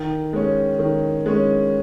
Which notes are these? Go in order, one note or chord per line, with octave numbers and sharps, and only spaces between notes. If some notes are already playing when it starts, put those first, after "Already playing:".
Already playing: D#3
G#3 C#4
D#3
G#3 C#4